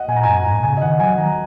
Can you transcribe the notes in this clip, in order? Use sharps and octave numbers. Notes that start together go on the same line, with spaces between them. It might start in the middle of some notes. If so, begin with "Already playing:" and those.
Already playing: D#5 F#5
A#2 G#5
A#5
F#2 G#5
A#5
G#2
A#2
C#3 G#5
D#5
D#3 F#5
F#3 G#5
D#3 A#5